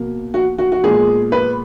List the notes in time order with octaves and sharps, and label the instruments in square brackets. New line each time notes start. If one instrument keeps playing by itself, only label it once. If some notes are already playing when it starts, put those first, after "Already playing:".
Already playing: [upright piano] B2 A#3
F#4
F#4
F#4
A#2 G#3 B3 G#4
B4